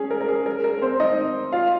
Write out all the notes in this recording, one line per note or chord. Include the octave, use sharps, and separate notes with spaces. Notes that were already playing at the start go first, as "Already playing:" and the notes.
Already playing: C#4 G#4
A#4
A#4
G#4
A#4
A#4
C4 C5
D#4 D#5
F4 F5